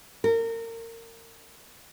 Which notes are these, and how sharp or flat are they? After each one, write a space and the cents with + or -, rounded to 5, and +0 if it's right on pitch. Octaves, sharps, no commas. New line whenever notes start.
A#4 -30